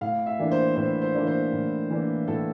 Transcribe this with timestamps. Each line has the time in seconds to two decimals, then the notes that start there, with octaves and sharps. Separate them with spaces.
0.01 A2 F5
0.26 E5
0.39 E3 A#3 D4
0.52 C5
0.76 A2 C5
1.02 C5
1.14 E3 A#3 D4
1.27 C5
1.52 A2
1.90 E3 A#3 D4
2.28 A2 A4